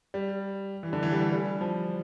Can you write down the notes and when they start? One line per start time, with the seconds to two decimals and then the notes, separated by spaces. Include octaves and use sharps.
0.14 G3
0.83 E3
0.93 D3
1.03 E3
1.13 G3
1.22 A3
1.32 G3
1.61 F3